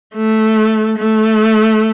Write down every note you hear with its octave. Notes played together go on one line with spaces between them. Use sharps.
A3
A3